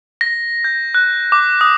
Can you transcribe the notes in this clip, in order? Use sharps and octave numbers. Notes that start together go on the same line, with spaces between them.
A#6
G6
F#6
D6
D#6